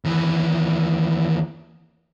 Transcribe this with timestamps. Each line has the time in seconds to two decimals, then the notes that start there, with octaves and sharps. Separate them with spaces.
0.05 D#2 E3